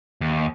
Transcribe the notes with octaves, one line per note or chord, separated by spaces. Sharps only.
D#2